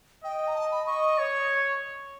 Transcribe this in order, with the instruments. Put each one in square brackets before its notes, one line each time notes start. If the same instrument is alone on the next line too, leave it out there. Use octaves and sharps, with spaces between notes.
[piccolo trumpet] D#5 [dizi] G5
[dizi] A#5
A5
B5
[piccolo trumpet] D#5 [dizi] C#6
[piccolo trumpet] C#5